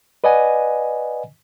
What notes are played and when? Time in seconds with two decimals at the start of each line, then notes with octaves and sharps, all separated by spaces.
0.24 B4 D5 D#5 F#5 G#5